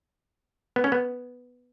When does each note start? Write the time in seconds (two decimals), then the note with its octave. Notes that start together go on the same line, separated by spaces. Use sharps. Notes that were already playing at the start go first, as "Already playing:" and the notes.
0.76 B3
0.84 C#4
0.92 B3